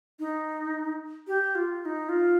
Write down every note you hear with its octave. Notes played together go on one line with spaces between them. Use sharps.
D#4
G4
F4
F4
D#4
F4